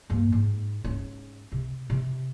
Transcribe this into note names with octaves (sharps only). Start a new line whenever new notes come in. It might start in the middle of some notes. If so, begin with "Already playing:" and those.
G2 A#3
G#2
G#2 C#4
C3
C3